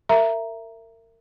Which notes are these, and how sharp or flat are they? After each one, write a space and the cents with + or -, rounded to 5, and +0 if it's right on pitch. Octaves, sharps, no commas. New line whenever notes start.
A#4 -35 E5 +15 A#5 +0